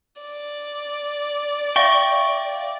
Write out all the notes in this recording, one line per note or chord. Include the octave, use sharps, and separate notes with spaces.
D5
E5 F5 G5 C#6